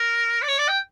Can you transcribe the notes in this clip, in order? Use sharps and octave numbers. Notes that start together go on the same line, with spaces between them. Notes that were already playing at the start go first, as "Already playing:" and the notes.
Already playing: A#4
D5
C#5
D5
G5